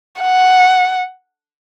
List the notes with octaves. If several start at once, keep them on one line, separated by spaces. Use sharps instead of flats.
F#5